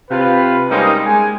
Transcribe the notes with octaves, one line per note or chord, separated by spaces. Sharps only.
C3 F4 B4
G3 G#3 A#3 C4 C#4 D#4
G#3 G#5